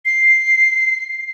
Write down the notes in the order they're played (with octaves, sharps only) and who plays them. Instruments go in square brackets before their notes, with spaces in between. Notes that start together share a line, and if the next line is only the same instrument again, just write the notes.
[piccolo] C7